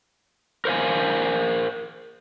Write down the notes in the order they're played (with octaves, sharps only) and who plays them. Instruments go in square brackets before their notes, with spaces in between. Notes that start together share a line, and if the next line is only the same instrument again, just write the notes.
[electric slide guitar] A#4 C5 F5 G#5